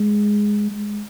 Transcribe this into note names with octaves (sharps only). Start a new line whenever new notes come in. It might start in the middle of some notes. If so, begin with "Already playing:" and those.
Already playing: G#3
G#3